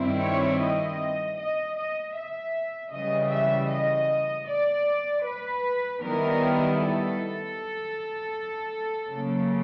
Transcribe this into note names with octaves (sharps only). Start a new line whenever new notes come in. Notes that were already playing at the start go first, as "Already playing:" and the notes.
Already playing: G2 D#3 G3 C4 E4
C#5
D#5
D#5
D#5
E5
C#3 E3 G3 D#5
E5
D#5
D5
B4
D#3 G3 B3 E4 A#4
A4
C#3 F#3 A#3